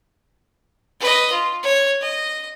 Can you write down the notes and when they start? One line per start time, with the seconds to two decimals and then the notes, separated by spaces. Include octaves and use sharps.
1.00 B4 D#5
1.32 F4
1.63 C#5
2.01 D#5